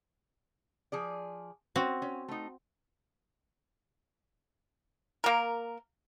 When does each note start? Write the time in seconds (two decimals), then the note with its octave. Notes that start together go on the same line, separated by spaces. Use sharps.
0.92 F3 G#4 D5
1.76 C4 C#4 F#4
2.02 C#4
2.28 A3 D#4
5.24 A#3 A#4